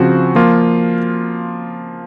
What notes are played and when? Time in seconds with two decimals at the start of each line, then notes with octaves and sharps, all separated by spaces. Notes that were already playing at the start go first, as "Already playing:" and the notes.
Already playing: C#3 F3 C4 F#4
0.35 F3 A#3 F4